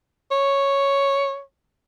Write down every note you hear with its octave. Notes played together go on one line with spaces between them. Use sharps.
C#5